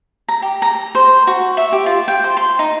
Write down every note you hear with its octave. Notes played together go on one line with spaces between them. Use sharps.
A#5
G4
A#5
C5
F#4
E5
G4
F4
G5
C5
C6
D#4